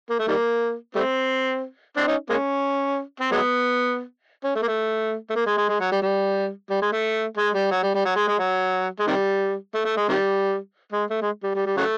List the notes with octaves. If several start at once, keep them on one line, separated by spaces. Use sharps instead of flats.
A#3
A3
D#3 G3 A#3
G3 A3 C4
C4 D4
C#4 D#4
G#3 A#3 C#4
C4
F#3 G#3 B3
C#4
A3
A#3
A3
A3
A#3
G#3
G#3
G#3
F#3
G3
G3
G3
G#3
A3
G#3
G3
F#3
G3
G3
F#3
G#3
G#3
F#3
G#3
C3 D#3 G3
A3
A3
G#3
C3 D#3 G3
G#3
A3
G#3
G3
G3
G3
C#3 F#3 A3